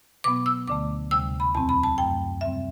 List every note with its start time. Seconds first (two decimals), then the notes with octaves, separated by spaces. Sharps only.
0.24 B2 F#3 B3 D6
0.46 E6
0.67 D2 D3 A3 D6
1.11 D2 C3 G3 E6
1.40 B5
1.55 E2 B2 F#3 C4 A5
1.69 B5
1.83 A5
1.98 F#2 F#3 A3 G5
2.41 C3 G3 C4 E5